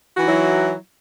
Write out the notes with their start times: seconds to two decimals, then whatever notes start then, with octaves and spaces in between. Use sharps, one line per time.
0.14 F#4
0.18 E3
0.21 D#4
0.25 F#3
0.29 E4